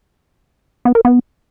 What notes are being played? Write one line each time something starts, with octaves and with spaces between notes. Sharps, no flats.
B3
A#4
B3